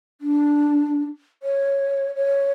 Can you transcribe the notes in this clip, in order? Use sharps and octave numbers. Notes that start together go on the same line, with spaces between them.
D4
C#5
C#5